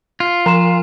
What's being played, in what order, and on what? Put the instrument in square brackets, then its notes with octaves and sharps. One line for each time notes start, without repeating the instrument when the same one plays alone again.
[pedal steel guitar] F4
[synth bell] F3 [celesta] A#5 C6 E7